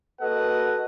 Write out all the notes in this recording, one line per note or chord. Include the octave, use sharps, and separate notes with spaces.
A#3 F#4 A4 B4 D#5 F#5